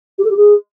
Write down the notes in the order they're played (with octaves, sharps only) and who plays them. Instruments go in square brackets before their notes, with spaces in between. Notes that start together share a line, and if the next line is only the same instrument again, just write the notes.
[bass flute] G4
A4
G4
G#4